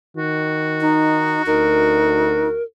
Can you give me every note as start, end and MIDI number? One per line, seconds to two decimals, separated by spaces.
0.17 1.39 51
0.17 2.63 66
0.81 1.42 63
1.46 2.57 38
1.46 2.49 63
1.46 2.63 70